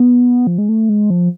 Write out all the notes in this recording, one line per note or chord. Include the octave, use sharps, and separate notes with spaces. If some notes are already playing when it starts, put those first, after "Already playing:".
Already playing: B3
F3
G#3
A3
G#3
F3